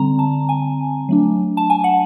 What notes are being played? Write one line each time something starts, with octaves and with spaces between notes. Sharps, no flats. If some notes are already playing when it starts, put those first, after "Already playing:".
Already playing: D3 G3 C4 A#5
A5
G#5
F#3 A3 D4
A5
G#5
F#5